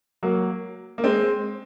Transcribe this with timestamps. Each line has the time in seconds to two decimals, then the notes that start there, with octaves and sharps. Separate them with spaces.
0.23 F#3 A#3
0.98 A#3
1.04 G#3 C4